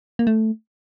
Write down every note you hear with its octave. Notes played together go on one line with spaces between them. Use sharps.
A#3
A3